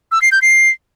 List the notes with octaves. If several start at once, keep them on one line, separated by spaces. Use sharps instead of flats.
E6
C7
G6
C7